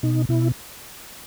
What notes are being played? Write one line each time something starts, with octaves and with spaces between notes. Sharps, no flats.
B2 D#4
B2 E4